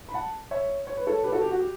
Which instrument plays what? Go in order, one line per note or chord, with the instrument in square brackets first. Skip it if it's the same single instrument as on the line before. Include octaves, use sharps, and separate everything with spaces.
[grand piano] B5
F#5 A5
C#5 E5
C#5
B4
A4 C#5
G4 B4
F#4 A4
G4
F#4
G4